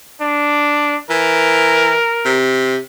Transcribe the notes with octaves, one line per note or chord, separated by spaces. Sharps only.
D4
E3 A#4
C3